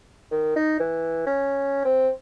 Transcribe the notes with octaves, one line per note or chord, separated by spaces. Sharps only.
D#3
D#4
E3
C#4
C4